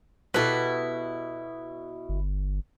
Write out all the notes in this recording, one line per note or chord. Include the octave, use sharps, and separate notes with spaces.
B2 E4 G4 A4 B4
G1